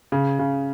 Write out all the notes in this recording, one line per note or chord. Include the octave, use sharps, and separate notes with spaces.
C#3
C#3